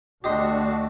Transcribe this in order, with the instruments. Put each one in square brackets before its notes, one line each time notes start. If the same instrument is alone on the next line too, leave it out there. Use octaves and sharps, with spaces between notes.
[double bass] D2 A3 [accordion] D4 F#4 [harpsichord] G4 D#5 C6